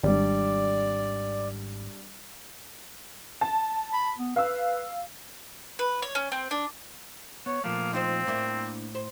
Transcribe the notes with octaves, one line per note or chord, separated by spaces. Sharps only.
G#1 G3 D4 D5
A5
B5
B3
B4 F5 E6
B4
C#5
C#4
C4
D4
B3 C#5
A#2 F3 A3 A#3
C4 D#4 F4 C5
A2 A#3 D4 E4
C5